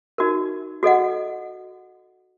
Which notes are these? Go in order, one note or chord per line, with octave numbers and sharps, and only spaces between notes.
D#4 F#4 A#4
F#4 A4 D#5 F#5